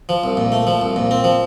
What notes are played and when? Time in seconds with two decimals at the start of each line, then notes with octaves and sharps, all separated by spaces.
0.09 F3
0.24 C2
0.37 A#2
0.52 A3
0.67 F3
0.81 C2
0.96 A#2
1.11 C4
1.24 F3